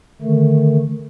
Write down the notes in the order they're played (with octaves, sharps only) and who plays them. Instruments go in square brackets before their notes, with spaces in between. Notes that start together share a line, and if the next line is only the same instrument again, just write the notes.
[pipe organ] D3 D#3 A3